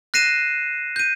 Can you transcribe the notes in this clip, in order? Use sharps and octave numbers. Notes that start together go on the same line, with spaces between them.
F#6 A#6 C7 D#7 E7
G6 D#7